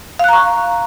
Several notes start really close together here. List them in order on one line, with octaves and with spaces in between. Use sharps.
F5 F#6 A#5 C#6